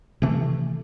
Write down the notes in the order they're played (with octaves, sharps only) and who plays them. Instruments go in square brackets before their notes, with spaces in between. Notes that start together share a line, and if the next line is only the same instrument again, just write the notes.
[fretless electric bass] C3 D#3 E3 A3